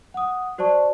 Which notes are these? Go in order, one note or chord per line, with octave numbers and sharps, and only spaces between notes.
F#5 D#6
F#4 C5 D5 A5 C#6